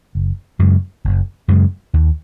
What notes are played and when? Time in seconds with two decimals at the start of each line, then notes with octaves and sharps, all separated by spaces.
0.15 F#1
0.59 F#2 C#3 G#3
1.05 F#1
1.48 F#2 C#3 G#3
1.93 D#2